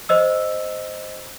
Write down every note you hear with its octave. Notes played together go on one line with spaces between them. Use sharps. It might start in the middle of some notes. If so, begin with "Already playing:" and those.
C5 D#5 E6